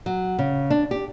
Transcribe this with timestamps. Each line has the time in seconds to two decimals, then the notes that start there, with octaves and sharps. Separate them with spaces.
0.06 F#3
0.39 C#3
0.70 D4
0.91 G4